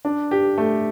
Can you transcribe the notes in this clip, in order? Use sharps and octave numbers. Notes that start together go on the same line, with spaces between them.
D4
G4
A3